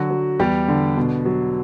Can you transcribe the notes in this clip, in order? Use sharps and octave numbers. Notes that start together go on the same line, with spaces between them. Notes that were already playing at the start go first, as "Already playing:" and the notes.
Already playing: D3 F#3 F#4
F#3
E2 G3 G4
D3
B2
F#3